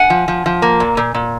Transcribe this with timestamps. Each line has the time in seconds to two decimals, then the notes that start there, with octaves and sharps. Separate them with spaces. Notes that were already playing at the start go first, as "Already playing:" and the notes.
Already playing: F#5 G#5
0.10 F3
0.28 F3
0.46 F3
0.62 A#3
0.80 A#2
0.97 A#2
1.14 A#2